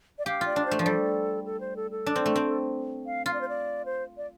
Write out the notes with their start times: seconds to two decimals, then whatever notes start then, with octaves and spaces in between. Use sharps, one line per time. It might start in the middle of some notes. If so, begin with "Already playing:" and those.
0.19 D5
0.26 G4 F5
0.41 F4 D5
0.56 D4
0.66 C5
0.71 A3
0.79 F3
0.86 G3 A4
1.46 A4
1.61 C5
1.76 A4
1.91 A4
2.06 D4
2.16 C4
2.26 A3
2.36 C4
3.06 F5
3.26 F4 F5
3.34 D5
3.41 C5
3.49 D5
3.86 C5
4.17 D5